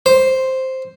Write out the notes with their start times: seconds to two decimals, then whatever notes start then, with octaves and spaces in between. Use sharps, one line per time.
0.06 C5